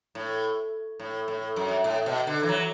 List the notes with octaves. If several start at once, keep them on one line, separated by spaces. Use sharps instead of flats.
A2
A2
A2
F#2
A2
B2
D3
E3
F#3